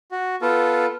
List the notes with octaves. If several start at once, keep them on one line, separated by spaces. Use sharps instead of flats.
F#4
B3 F4 A4